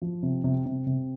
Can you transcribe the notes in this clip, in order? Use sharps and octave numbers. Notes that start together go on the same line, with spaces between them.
F3
C3
C3
C3
C3